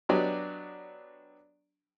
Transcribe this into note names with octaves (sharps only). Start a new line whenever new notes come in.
F#3 B3 D4 G4 D5 D#5